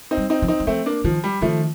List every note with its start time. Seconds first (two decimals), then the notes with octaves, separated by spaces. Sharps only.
0.11 C4 D#4
0.17 G3
0.30 C4 D#4
0.42 F3
0.48 C4 D#4
0.60 G3
0.67 F3 A3 C4
0.86 A#3 D4
1.04 D#3 F3
1.24 G3
1.41 D#3 F3 A3